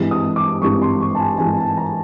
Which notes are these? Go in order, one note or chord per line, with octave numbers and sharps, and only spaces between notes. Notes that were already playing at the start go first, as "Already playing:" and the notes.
Already playing: G#1 G2 E3 G#3
D#6
D6
G#1 G2 E3 G#3 C#6
C6
C#6
A5
G#5
G#1 G2 E3 G#3 G#5
A5
A#5